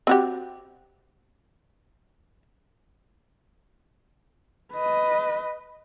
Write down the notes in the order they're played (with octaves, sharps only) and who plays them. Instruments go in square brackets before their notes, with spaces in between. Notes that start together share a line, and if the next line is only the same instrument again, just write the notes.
[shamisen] C4 F#4 G4
[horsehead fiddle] B4 D#5